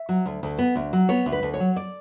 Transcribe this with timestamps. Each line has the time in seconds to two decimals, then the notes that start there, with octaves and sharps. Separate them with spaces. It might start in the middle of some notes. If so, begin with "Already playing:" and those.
Already playing: E5
0.09 F#3
0.26 D2
0.43 D2
0.59 B3
0.75 D2
0.93 F#3
1.09 B3 C#5
1.26 D2
1.32 B4
1.43 D2
1.54 C#5
1.60 F#3
1.77 D5